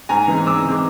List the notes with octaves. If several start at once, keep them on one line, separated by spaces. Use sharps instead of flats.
G#2 G#5 A#5
E3 G#3 C4
G#2 D6 E6
E3 G#3 C4